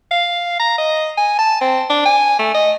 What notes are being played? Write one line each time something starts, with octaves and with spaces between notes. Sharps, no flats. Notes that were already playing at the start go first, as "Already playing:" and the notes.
F5
A#5
D#5
G#5
A5
C4
D4
G#5
A3
D#5